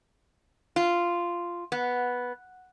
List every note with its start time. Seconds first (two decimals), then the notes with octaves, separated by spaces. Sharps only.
0.76 F4
1.72 B3